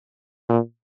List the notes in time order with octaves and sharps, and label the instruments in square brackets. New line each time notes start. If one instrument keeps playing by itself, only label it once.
[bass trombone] A#2